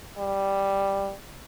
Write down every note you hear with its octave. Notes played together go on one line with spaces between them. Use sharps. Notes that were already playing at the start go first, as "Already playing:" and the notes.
G3